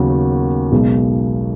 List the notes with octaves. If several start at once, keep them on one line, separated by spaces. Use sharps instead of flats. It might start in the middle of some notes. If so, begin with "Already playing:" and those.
Already playing: D#2 C#3 F#3 B3 F#4
B1 B2 G#3